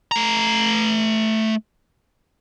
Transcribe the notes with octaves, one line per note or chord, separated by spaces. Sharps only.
A3 A#5